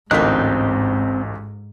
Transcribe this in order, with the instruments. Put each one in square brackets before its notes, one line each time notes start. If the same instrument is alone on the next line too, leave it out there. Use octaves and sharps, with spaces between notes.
[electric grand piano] A1 D2 B6 [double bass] G#2 [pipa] A#3 D#4 [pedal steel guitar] C4 F#6